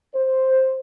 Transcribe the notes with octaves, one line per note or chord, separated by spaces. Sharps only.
C5